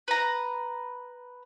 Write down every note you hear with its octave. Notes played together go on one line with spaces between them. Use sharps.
B4 A#5